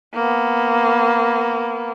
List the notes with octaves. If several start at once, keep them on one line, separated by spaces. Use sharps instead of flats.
A#3 B3